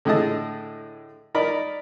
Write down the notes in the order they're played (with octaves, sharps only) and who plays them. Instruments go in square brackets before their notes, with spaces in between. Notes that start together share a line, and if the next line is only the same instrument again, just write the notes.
[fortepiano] A2 D3 G#4 D#5 A5 D#6
D#4 A#4 D5 B5